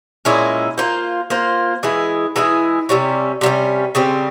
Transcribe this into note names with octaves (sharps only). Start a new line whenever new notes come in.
A#2 G#3 C#4 E4
A#3 F4 C5
A#3 F4 C5
E3 G#3 E4 G#4
E3 G#3 E4 G#4
C3 G3 C#4
C3 G3 C#4
C#3 G3 C4